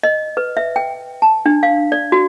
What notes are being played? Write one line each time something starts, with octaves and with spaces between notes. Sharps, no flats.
D#5
B4
E5
G5
A5
D4
F5
D5
F#4